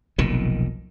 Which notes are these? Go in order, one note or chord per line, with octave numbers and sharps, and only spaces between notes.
F1 B1 A#2 D#3